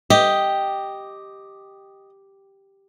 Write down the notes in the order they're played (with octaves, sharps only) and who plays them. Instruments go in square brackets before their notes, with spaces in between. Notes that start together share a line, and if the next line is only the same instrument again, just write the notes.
[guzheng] G4 [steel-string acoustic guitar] D#5